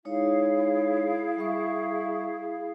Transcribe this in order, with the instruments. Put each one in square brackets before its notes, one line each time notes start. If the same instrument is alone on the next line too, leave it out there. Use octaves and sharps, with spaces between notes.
[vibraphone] G#3 D#4 C#5 [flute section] E4 G#4 F5
[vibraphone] G3 E5 C#6